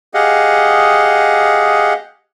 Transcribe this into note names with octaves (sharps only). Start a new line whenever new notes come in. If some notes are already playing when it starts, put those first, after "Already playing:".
G4 G#4 D#5 F5 F#5